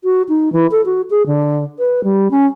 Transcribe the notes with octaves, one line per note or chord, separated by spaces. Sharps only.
F#4
D#4
E3
A4
F#4
G#4
D3
B4
G3
C#4